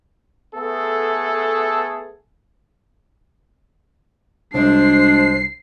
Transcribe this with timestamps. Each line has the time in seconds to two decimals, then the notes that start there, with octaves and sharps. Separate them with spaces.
0.55 A3 B3 G#4 A4
4.54 C2 F#3 G#3 D4 C5 C7